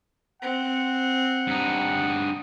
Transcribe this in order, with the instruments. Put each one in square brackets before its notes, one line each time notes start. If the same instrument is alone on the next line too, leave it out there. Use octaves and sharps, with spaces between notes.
[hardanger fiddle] C4 [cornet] F#5
[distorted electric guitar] G2 D#4